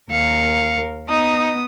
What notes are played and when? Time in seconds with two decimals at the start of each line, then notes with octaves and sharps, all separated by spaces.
0.11 D#2 A#4 F5 C#7
1.09 B3 D#4 D#6